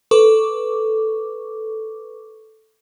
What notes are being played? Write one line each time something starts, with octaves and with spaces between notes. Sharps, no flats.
A4 B4 C#6 D6